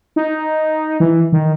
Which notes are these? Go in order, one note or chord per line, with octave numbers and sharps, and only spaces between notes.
D#4
E3
D#3